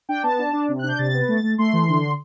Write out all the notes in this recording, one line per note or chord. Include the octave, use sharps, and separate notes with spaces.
D4 G5
B3 A5
D4
D4
C3
F#6
D4 G6
C3 A6
B3
A3
A3
A3 C6
E3
D3